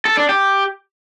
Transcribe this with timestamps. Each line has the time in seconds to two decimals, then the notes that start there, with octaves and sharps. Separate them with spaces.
0.05 A4
0.17 D4
0.29 G4